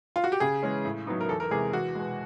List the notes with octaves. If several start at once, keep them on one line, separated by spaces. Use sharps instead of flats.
F4
F#4
G4
C#3 G#4
E3 G#3 C#4
A2
F#3 B3 D#4
A#4
E2 A4
A#4
C3 E3 G#3 G#4
E2 F#4
B2 G#3